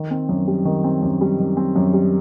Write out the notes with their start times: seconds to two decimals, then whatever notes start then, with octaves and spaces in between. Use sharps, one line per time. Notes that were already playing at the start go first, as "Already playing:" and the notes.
Already playing: D#3
0.11 C4
0.29 F#2
0.48 G3
0.65 D#3
0.84 C4
1.02 F#2
1.21 G3
1.39 D#3
1.57 C4
1.76 F#2
1.93 G3